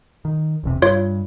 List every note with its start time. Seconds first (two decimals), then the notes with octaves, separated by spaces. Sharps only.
0.25 D#3
0.64 E1 E2 C3
0.82 G2 F4 C#5